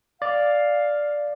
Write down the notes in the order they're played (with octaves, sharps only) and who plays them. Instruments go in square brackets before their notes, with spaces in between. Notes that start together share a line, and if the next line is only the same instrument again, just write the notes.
[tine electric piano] D5 [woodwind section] F5